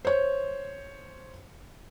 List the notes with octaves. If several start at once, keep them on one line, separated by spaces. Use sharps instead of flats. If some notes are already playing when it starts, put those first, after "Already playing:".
C5 C#5